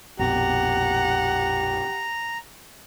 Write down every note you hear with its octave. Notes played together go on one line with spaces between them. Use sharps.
A#1 F2 B2 G4 F#5 A#5